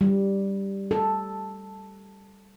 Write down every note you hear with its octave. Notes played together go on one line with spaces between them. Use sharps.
G3
A4